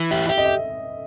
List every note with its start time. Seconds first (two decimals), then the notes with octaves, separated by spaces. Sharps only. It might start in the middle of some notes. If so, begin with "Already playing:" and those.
Already playing: E3
0.11 G4 E5
0.28 G4 E5
0.38 D#5
0.45 E5